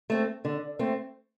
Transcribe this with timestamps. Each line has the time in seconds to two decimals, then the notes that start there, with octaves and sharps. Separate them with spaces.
0.10 A3 C4
0.45 D3
0.79 A3 C4